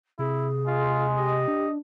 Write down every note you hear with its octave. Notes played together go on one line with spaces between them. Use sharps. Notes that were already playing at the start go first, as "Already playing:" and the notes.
C3 E4 G#4
G#3 F4
G4 D#5
D4